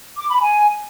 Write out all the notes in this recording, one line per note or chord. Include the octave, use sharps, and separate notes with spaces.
D6
B5
G#5